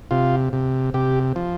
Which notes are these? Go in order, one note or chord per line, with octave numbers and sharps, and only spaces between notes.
C3 F4
C3
C3 G4
F3